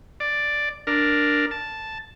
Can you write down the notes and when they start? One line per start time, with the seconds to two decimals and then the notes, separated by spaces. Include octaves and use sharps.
0.20 D5
0.87 D4 A#4
1.51 A5